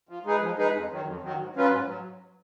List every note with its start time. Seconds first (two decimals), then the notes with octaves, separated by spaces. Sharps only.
0.09 F3
0.25 G#3 D#4 G#4 B4
0.41 F3
0.58 G#3 D#4 G#4 B4
0.73 F2
0.90 D#3 F#3
1.06 F2
1.22 D#3 F#3
1.39 G#2
1.55 F#3 C#4 F4 B4
1.71 G#2
1.87 F#3